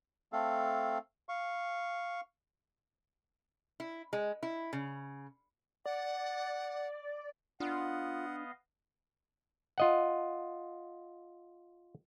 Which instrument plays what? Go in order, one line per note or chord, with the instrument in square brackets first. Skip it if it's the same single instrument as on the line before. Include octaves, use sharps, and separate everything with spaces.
[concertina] A3 C4 A4 F5
F5 C#6
[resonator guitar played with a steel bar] E4
G#3
E4
C#3
[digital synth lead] D5 [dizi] F#5
[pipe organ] B3 D#5 F5 [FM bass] D4 [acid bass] F4 [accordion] F#5
[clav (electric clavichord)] F4 D#5 F#5